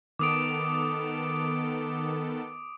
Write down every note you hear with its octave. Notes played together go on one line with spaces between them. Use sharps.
D#3 B3 A4 D6 D#6 D7